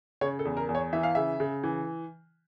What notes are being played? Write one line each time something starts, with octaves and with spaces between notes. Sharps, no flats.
C#3 C#5
A4
E2
A#4
E2
C#5
E3 E5
F5
C#3 E5
C#3
E3